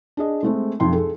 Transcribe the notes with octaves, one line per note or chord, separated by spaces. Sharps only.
D4 G#4 D#5
G#3 A3 C4
B1 F2 G5 C6
G#4 A4